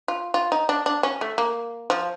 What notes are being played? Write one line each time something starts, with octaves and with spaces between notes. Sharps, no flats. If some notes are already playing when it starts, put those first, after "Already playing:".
F4
F4
D#4
D4
D4
C#4
A3
A#3
F3